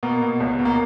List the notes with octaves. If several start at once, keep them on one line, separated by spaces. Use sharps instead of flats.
B2 A#3
B2
C#2
B2
A#3